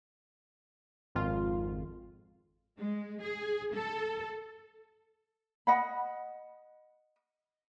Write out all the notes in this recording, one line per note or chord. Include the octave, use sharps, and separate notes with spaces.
G#1 F2 F4
G#3
G#4
A4
D#5 F#5 B5